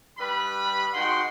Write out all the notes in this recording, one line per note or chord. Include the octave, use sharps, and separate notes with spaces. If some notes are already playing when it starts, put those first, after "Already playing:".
G2 G3 B4 B5
G#3 D#4 F#4 F#5 G5 C6